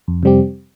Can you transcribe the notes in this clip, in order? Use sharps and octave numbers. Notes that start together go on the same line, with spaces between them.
F2
C3 G3 C4 G4